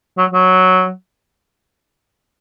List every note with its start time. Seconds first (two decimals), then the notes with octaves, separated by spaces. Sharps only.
0.18 F#3
0.32 F#3